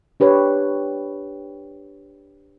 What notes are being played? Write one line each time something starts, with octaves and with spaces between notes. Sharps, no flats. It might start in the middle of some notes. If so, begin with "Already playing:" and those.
D4 G4 B4 C#5